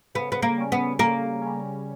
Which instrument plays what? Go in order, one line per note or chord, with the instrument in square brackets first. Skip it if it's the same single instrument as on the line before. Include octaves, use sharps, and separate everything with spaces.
[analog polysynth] C#3 [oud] B3
[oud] B3
A#3
[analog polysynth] G3 C#4
[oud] B3
[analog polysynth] C#3 [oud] A#3
[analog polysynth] G3 C#4